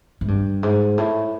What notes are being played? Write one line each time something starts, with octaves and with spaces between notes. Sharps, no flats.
G#2
G2
G#2
A2